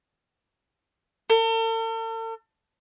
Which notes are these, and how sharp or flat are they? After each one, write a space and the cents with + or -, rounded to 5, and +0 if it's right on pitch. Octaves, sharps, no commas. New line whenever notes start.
A4 +45